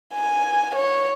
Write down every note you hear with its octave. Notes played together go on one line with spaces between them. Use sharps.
G#5
C#5